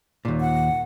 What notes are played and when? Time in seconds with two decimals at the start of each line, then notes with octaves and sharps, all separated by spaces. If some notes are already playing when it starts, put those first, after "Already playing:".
0.25 D#2 A#2
0.41 F#5